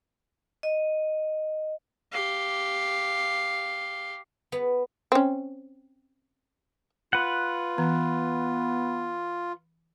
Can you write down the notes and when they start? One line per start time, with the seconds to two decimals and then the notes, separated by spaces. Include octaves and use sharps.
0.63 D#5
2.12 G4 F5
4.52 B3
5.12 C4 C#4
7.13 F4 B4 F#5
7.78 E3 B3